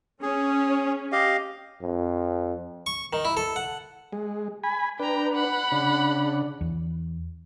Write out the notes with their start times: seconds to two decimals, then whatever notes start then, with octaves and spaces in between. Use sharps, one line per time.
0.22 C#4 G#4
1.12 G4 D#5 F5
1.82 F2
2.86 C#6
3.13 D#3
3.25 E4
3.37 A4
3.56 F#5
4.12 G#3
4.64 G#5 B5
5.00 D4 B4 G5 A#5
5.33 F#5 B5
5.72 C#3 D4
6.61 E2